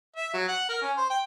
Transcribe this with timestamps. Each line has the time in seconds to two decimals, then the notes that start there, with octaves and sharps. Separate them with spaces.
0.16 E5
0.34 F#3
0.48 F#5
0.69 A#4
0.82 C#4
0.97 C5
1.11 G5